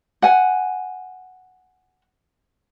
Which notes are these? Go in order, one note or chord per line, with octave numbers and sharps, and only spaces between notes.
F#5 G#5